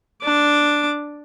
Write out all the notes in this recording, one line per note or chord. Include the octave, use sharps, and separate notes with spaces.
D4 D6